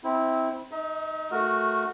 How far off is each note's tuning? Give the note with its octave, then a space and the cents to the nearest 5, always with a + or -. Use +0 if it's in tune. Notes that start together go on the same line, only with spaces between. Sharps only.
C4 +0 E4 -20
D#4 +0 D#5 +45
A3 -10 F#4 -10 A#4 +0